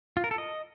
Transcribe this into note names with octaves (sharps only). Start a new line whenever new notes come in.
F4
A#4
A4
D#5